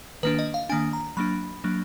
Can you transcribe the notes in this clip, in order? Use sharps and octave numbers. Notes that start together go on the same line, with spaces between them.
D#3 A#3 D4 B4
D#5
F5
D#3 A#3 D4 G#5
A#5
F#3 A#3 D4 B5
F#3 A#3 D4